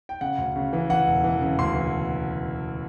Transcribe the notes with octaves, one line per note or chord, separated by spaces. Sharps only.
G5
C#3 F#5
D2
C#3
E3
E3 F#5
E1
E3
C#3
D2 C6
E3